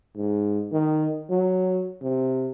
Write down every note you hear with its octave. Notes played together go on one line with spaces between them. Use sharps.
G#2
D#3
F#3
C3